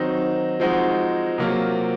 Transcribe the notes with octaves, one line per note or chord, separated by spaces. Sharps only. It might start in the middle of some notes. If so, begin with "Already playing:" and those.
Already playing: D#3 F#3 C4 D#4
F3 G#3 C4 D#4 F#4
C3 F#3 A#3 F4